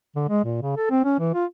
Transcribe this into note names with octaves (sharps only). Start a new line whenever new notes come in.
D3
G#3
A#2
C#3
A4
C4
C#4
E3
F4